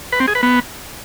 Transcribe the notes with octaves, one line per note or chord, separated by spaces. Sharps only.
B4
C4
G#4
B4
B3